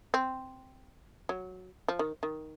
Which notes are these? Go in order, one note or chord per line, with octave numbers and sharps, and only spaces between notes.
C4
F#3
F3
D#3
D#3